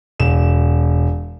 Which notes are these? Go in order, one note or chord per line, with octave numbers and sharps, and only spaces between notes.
E1 E7